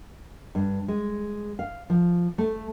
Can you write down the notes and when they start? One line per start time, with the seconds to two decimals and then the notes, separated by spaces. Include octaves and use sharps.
0.55 G2
0.88 G#3
1.59 F5
1.90 F3
2.38 A3